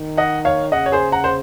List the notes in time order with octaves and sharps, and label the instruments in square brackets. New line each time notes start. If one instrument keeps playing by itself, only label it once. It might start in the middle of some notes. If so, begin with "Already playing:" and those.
Already playing: [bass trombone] D#3
[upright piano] D#5 F#5
C#5 F5
[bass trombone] C#3 [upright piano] D#5 F#5
[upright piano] C#5
G#4 C5
F#5 A#5
C5